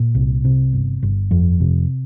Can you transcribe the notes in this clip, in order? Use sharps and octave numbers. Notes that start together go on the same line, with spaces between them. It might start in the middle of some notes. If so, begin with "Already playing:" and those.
Already playing: A#2
C2
C3
G1
G1
F2
C3